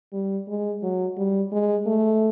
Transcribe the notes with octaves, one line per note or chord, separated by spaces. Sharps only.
G3
G#3
F#3
G3
G#3
A3